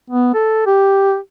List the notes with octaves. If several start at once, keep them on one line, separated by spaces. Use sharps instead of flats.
B3
A4
G4